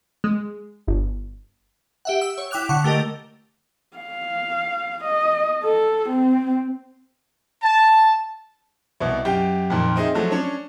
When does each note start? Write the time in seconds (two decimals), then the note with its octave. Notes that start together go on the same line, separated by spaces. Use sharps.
0.24 G#3
0.87 G1
2.05 G4 E5 F#5
2.21 E6
2.38 C#5
2.51 E4 G5 D6 F#6 F7
2.69 D3 F#5 C#6 E7
2.84 A3 G4 A#4 D#5
3.97 F5
5.04 D#5
5.64 A4
6.09 C4
7.63 A5
9.00 C2 B2
9.25 F#2 G4 G5
9.70 F2 A#2 D#3 A#4
9.96 C4 D#4 G#4 E5
10.15 F3 F#3 A3
10.31 C#4 D4 C#5